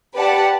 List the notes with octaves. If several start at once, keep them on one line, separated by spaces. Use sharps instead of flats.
G4 B4 D5 F#5 A5